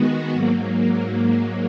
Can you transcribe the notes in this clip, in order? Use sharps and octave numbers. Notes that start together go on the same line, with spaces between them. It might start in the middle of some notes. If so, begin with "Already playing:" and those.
Already playing: D#3 G#3 B3 F#4
G#2 F#3 A#3